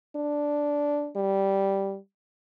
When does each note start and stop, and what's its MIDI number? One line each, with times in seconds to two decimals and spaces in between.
0.16 1.10 62
1.16 1.97 55